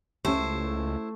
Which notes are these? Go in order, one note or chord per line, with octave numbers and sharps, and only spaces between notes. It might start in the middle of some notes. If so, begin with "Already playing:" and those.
C#2 A3 C#4 E4 G4 C5